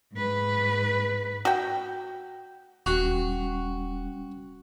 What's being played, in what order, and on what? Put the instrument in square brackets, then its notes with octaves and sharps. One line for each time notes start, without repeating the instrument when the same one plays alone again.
[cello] G#2 B4
[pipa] F#4 G5
[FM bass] D#1 [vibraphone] G3 C#4 [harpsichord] F#4